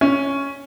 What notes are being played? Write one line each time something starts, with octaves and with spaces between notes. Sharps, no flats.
C#4